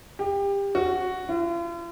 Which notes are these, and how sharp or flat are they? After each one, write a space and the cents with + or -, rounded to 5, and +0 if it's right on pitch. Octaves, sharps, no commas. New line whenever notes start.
G4 +25
F#4 +0
F4 -45